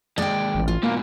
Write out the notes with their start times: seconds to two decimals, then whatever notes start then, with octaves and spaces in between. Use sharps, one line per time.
0.18 D#2 G#3 D5 G5
0.55 A1
0.68 F4
0.83 G#2 B2 A#3